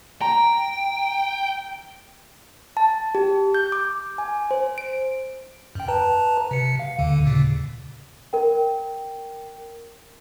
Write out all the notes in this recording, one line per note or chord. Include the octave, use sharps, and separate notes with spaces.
G5 A#5
A5
G4
G6
D6
G#5
C5
D7
F#2 G5
B4 A5 A#5
C3 C#7
F5
D#2 D3
D#2 A#2 C#3
A#4 G5